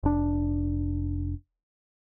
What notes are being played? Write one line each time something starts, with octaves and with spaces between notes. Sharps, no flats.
F1 D4